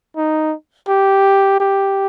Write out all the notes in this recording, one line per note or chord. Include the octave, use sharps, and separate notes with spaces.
D#4
G4
G4